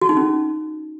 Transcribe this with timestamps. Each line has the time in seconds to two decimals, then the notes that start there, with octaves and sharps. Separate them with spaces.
0.02 F#4
0.09 D#4
0.17 C#4